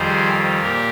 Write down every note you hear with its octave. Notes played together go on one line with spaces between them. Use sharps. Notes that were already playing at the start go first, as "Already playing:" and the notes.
Already playing: F2 D#3 G3 G#4 C5
A#2 G4 A#4